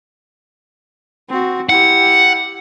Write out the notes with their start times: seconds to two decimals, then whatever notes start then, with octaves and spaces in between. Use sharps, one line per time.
1.29 C4 F#4
1.69 E4 G4 F#5